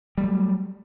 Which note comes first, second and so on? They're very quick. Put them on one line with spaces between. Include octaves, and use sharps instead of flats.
G3 A3 F#3